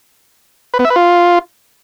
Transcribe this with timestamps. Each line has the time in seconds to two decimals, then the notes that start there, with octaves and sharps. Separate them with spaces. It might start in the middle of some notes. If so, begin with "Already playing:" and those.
0.74 B4
0.79 B3
0.85 E5
0.90 B4
0.96 F4